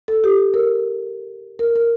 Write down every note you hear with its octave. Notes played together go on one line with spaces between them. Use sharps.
A4
G4
A#4
A#4
A#4